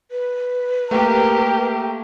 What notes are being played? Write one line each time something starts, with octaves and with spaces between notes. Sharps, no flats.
B4
A3 A#3 G4 A#4